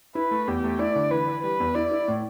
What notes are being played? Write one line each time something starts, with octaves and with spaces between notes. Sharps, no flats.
E4 B4
A3
E2 G4
A3
E4 D5
D3
E3 B4
E3
G3 B4
E2
E4 D5
E4
A2